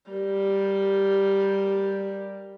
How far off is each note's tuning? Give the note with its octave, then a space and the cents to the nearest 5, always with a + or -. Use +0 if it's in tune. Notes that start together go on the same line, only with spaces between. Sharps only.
G3 +0 A#4 +0